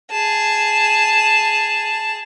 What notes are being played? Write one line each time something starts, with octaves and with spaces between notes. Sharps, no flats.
G#4 A5